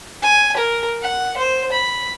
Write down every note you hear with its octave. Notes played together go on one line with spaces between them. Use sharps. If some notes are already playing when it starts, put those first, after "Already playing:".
G#5
A#4
F#5
C5
B5